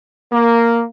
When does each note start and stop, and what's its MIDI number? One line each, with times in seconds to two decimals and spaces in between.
0.33 0.85 58